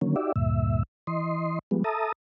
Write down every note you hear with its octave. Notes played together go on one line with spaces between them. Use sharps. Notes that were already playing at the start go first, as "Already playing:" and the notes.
D3 D#3 F#3 A#3 C#4
D#4 F#4 G4 D5 E5
D2 G2 A#2 E5
E3 D#5 C6
F3 G3 G#3 B3
A4 E5 A5 A#5 D#6